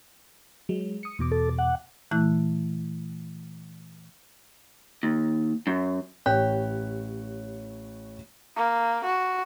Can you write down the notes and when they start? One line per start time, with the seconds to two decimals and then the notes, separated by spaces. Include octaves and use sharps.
0.69 F#3 G#3
1.03 D#6 C#7
1.19 E2 B2 D6
1.32 A4
1.58 F#5
2.11 A#2 E3 A3 E4 F#6
5.03 D#2
5.67 F#2
6.26 A1 G4 C#5 F#6
8.56 A#3
9.04 F#4